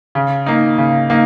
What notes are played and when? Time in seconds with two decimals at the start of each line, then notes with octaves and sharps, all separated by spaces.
0.15 C#3
0.46 A#3 D#4
0.78 C#3
1.10 A#3 D#4